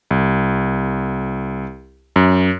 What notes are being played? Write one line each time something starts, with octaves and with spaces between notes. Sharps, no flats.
C2
F#2